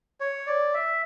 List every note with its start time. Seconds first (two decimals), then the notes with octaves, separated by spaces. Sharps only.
0.20 C#5
0.47 D5
0.74 E5